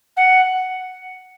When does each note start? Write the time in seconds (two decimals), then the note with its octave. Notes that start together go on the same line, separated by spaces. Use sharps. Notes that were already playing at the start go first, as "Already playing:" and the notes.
0.16 F#5